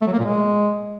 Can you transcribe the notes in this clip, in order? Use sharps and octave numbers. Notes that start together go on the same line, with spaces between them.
A3
F#3
A#3
A#2
G#3